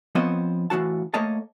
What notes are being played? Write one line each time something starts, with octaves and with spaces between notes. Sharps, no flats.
F3 B3 C4 C5 C#5 D#5
A2 E3 C4 F#4 A5
A3 A#3 C#5 D#5 A5